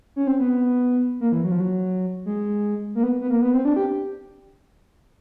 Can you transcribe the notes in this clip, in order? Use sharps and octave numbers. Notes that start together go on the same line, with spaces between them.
C#4
C4
B3
A#3
E3
F#3
F3
F#3
G#3
A#3
B3
B3
A#3
B3
C4
D4
G4